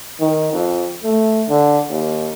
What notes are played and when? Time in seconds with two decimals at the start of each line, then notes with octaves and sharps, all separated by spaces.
0.20 D#3
0.53 F2
1.04 A3
1.49 D3
1.90 D#2